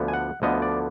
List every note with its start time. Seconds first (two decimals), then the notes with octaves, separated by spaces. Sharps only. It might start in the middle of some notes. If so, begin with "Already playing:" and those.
Already playing: D2 D3 F3 B3
0.08 G#5
0.13 F#5
0.42 D2 D3 F3 B3 D#5
0.62 D5